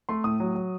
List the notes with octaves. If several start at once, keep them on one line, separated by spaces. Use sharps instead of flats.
A3 C6
A2 D#6
F#3
F#3